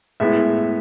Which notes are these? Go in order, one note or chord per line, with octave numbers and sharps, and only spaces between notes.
A2 G#3 B3 E4 E5